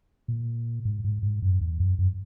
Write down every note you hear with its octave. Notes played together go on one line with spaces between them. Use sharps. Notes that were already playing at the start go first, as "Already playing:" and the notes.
A#2
G#2
G#2
G#2
F#2
E2
F#2
F#2